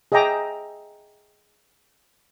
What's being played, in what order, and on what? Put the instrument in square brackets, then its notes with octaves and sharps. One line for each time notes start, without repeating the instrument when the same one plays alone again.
[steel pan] G#4 D#5 E5 G5 A#5 D6